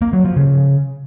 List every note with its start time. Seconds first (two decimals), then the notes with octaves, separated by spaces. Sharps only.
0.02 A#3
0.13 F#3
0.25 F3
0.36 C#3